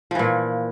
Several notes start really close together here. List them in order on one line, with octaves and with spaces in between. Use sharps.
F3 E3 A#2